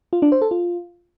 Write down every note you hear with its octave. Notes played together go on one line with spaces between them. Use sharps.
F4
D4
C5
A4
F4